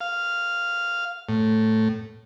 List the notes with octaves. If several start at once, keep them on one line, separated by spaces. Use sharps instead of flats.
F5
A2